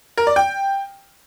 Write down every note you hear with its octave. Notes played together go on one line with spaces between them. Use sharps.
A#4
D5
G5